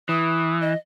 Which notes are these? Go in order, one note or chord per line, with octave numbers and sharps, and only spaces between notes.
E3 D#6
D#5